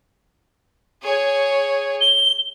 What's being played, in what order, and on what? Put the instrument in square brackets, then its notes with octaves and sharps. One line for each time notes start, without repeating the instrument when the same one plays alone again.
[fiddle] G#4 C#5
[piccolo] G7